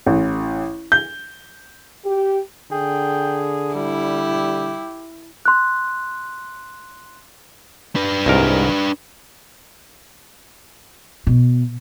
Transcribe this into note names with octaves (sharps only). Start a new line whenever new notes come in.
A1
G6
G4
D3 G#4 G5
G3 E4 G4
C6 F#6
D4 B4
C2 G#2 A#4
B2